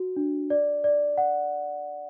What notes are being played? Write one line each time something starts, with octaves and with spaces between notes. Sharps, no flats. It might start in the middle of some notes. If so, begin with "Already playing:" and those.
Already playing: F#4
D4
D5
D5
F#5